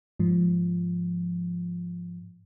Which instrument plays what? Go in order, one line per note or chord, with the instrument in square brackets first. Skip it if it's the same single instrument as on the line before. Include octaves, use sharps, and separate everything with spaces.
[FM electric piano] G#2 F3